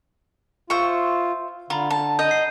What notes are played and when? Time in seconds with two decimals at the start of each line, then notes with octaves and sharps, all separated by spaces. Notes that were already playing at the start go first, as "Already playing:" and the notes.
0.70 F4 C5 E5 C#6
1.70 D3 F4 A#5 B5
1.90 A5
2.19 D#5 G6 D#7
2.31 C7